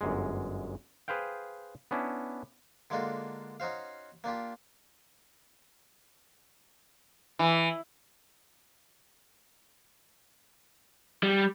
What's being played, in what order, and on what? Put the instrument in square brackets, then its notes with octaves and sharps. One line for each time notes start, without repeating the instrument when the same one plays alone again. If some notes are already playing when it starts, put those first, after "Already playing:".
[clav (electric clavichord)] G1 F#2 G#3
G#4 B4 C5 F5 G5
B3 C#4 D4 E4
[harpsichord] D3 G#3 A#3 D4 F4 F#4
C#4 D#4 F#4 C5 F5
A#3 D4 F4 G4
[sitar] E3
[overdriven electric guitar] G3